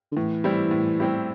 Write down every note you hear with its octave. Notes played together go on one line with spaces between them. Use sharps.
D3
A2 E3
G3 C4 E4 G4
A2
G3 C4 E4 G4